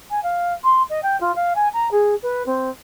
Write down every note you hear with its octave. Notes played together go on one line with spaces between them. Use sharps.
G#5
F5
C6
D#5
G5
F4
F5
G#5
A#5
G#4
B4
C4